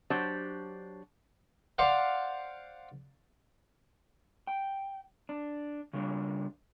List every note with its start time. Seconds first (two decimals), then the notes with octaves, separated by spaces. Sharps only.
0.10 F#3 D4 G4 C5
1.78 C5 D5 F5 F#5
4.47 G5
5.29 D4
5.93 C#3 G3 D4